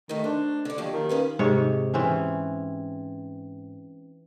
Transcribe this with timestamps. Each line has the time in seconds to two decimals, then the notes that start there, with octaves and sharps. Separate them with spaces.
0.09 D#3 A3 D#4
0.24 D4 C5
0.65 D3 D5
0.78 D#2 F3 F#3
0.93 D#3
1.09 C#4 F4 B4
1.39 G#2 C3 C#5
1.94 E3 C4 C#4